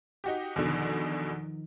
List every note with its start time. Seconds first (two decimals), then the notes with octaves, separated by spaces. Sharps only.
0.24 D#4 F#4 G4
0.56 E2 B2 D3 D#3 F3 D#4